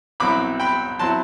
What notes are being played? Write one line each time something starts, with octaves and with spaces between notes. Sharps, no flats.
C2 B2 F#3 C4 E4 B5 D6
G5 B5
F#3 C4 E4 A5 C6